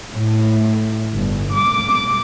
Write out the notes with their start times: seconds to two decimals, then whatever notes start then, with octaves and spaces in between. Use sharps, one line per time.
0.13 A2
1.13 G1
1.54 D6